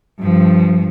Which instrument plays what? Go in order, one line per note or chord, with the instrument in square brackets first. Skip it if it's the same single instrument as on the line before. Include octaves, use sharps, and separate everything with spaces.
[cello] G2 F3